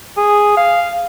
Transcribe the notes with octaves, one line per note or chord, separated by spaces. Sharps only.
G#4
F5